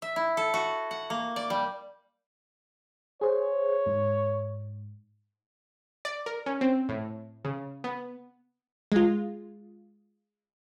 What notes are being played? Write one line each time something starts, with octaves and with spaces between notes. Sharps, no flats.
E5
E4
A4
F#4
F#5
A#3
D5
G3
G#4 C5 C#5
G#2
D5
A#4
C#4
C4
A2
C#3
B3
G#3 F4